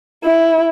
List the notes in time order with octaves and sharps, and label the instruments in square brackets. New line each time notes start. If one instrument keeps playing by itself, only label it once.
[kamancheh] E4